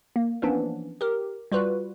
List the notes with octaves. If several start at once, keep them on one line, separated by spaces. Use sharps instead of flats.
A#3
E3 F3 A#3 B3 C#4 D4
G4 A#4
G3 F4 F#4 B4